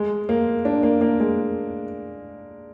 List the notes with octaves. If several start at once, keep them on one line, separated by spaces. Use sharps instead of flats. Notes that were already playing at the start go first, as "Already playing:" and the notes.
Already playing: G#3
A#3
D4
A#3
A#3
G#3